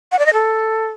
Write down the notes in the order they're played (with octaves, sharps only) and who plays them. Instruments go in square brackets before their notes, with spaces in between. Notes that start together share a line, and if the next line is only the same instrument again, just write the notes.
[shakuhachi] F#5
D5
D#5
A4